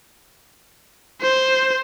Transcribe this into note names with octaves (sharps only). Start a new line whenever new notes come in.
C5